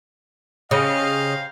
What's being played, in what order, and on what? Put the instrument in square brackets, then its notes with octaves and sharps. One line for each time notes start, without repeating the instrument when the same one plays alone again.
[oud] C#3 [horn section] G4 C5 F5 [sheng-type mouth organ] D#5